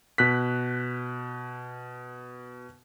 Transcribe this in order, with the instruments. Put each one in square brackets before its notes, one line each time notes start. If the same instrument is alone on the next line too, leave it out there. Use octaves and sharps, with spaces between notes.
[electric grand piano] B2 F#6 B6